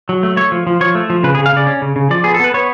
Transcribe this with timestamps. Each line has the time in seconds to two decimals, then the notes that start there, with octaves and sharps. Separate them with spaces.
0.09 F#3
0.23 A3
0.37 A3 C#5
0.52 F3
0.67 F3
0.81 F3 C#5
0.95 A3
1.10 F3
1.23 C#3 B4
1.35 G#4
1.38 C#3
1.46 F5
1.53 C#3 D5
1.67 C#4
1.82 C#3
1.96 C#3
2.10 F3 D5
2.24 B3 G#4
2.34 A4
2.39 B3 B4
2.54 B3 C#5